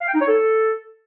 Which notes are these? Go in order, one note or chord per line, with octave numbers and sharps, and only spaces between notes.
F5
G5
D#4
C#5
A4